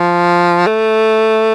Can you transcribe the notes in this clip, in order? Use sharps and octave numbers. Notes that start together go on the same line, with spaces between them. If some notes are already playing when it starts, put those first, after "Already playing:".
Already playing: F3
A3